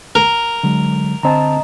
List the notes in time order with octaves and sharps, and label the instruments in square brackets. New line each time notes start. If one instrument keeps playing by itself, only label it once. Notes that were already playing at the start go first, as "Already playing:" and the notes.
[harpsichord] A#4
[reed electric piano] D3 F#3 G#3
[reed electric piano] D3 C4 A5 [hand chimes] D#5 A#5